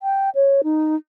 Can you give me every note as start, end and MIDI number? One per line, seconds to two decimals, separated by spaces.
0.03 0.30 79
0.35 0.61 73
0.64 0.96 63